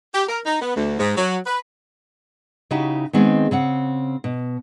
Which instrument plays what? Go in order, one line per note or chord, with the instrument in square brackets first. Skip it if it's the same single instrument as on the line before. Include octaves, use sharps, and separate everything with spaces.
[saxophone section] G4
A#4
D#4
B3
D2
G#2
F#3
B4
[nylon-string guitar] C#3 D#4 E4 F#4 G4
D#3 G#3 B3 C4 G#4
C#3 C4 F#5
B2